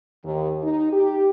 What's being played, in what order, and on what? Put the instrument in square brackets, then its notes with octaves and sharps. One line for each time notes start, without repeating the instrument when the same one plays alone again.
[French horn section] D#2
D#4
G4